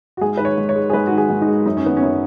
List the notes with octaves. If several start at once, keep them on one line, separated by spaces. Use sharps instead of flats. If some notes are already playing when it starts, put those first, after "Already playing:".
F#4
G#2 G#4
D#3 B4
C#5
G#2
C#5
G#3
G#4
G#2 B4
D#3 F#4
G#4
G#2
D#4
G#3
F#2 D#4
C#4
D#3 B3
F#2 C#4